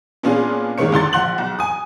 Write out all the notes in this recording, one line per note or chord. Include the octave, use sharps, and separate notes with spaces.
A#2 B3 C#4 D4 F4 G#4
G1 D#3 G#3 A#3 C#5 C#7
C#2 D3 C6 A6
A#1 F#5 C6 F#6 F#7
B1
G#5 D#6